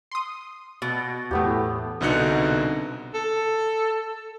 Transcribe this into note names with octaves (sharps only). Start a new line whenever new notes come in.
C6 D#6
B2
E2 A2 A3 B3 G4
C2 B2 D3 D#4 F#6 C#7
A4